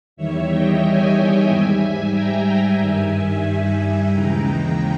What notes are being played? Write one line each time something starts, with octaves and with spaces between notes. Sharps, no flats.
E2 D#3 G3 C#5 E5
D#5 G5
E5 G#5
G#2 G3
G5 A#5
G5 A#5
G2 D#3 G3 E5 G#5
D#2 C#3 E3 G#3 G5 A#5